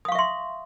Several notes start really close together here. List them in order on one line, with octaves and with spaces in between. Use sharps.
D#6 F5 C#6 E5 C6